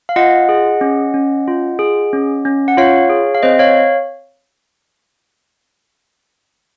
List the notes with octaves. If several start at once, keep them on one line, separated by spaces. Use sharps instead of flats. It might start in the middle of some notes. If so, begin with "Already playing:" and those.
F5
F4 D#5 F#5
G#4
C#4
C#4
F4
G#4
C#4
C#4
F#5
F4 C#5 F5
G#4
F5
C4 C5 D#5
C#5 F5